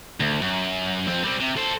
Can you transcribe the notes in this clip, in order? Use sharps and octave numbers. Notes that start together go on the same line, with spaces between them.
D2
F#2
F2 C4
G3 C4
C3
A4 C5